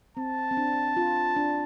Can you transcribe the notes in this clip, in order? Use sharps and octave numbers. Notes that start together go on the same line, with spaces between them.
C4 A5
C4
D4
F4
D4